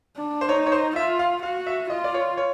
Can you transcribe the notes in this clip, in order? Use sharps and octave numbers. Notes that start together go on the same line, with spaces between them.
D4
C5
D#4 C#5
C#5
C5
F4 E5
F5
F#4 F5
E5
F4 D#5
D5
C#5
C#5